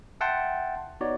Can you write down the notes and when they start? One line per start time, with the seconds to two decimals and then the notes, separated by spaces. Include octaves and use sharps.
0.21 E5 F#5 G5 A5 C6
1.01 B3 D#4 F#4 C#5 D5